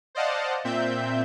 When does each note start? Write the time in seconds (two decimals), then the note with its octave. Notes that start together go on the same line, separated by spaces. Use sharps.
0.15 C5 D5 D#5 F5 F#5 A5
0.64 A#2 C4 E5 G6